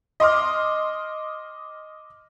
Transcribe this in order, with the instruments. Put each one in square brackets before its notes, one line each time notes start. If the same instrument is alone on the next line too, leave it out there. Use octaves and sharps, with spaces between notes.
[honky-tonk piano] D#5 C6 D6 F6